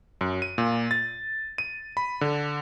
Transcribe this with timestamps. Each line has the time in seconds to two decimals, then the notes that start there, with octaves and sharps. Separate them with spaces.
0.21 F#2
0.42 D#7
0.58 A#2
0.91 A6
1.58 D#7
1.97 B5
2.21 D3